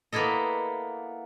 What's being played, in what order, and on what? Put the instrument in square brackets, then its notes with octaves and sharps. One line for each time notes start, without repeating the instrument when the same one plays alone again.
[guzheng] A#3 B3 E4 A4 D#5